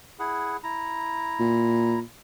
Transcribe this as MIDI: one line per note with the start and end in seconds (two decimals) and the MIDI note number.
0.19 0.57 64
0.19 0.57 68
0.19 0.57 78
0.63 1.99 64
0.63 1.99 82
1.39 2.01 46